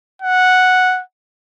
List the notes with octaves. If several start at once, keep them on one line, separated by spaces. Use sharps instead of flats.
F#5